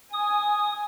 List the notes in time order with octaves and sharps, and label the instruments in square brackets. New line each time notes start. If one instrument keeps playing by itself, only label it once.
[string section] G#5 [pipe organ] D#6